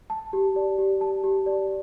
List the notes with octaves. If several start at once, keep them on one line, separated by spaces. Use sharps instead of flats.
A5
G4
D5
G4
A5
G4
D5